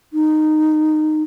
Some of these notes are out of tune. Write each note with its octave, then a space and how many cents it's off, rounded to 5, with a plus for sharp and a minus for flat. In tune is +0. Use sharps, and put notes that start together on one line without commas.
D#4 -15